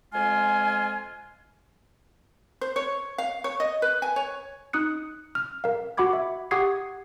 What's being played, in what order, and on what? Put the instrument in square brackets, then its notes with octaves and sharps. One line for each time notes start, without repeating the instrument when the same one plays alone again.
[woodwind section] F2 G#3 F4 G#5
[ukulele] C5
C#5
F5
C#5
D#5
B4
G#5
C#5
[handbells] D#4 D#6 F#6 C#7
F6
A#4 F5
F#4 F#5 B5 D6 G#6
E5
G4 F#5 C#6 D#6 G#6 C7